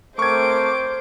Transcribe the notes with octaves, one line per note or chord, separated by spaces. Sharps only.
A3 C4 A#4 C5 C#6 D6 G#6